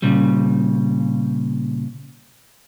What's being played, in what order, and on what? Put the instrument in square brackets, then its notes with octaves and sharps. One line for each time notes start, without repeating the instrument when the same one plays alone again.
[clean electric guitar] A#2 C#3 G3